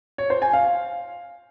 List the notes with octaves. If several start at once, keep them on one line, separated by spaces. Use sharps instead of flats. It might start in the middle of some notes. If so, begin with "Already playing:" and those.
C#5
C5
G#5
F5